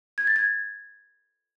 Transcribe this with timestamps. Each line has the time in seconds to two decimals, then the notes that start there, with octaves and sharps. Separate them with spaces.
0.18 G#6
0.27 A6
0.36 G#6